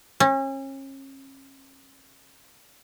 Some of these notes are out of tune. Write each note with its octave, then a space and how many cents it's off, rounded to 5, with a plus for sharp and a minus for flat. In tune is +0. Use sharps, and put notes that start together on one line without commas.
C#4 -35